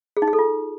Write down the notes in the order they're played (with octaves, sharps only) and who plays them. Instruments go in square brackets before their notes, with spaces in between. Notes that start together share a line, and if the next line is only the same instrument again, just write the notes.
[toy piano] G#4
D#4
G#4
A4
F4